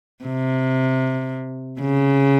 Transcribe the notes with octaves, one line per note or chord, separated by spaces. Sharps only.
C3
C#3